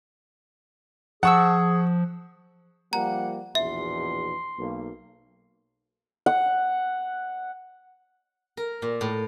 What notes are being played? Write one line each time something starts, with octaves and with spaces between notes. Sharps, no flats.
F3 G#4 F#5 A5 C#6 E6
F3 G3 A#3 F#5 A#5
A#1 E2 B2 E5 C6
B1 A#3
F#5
A#4
A#2
A2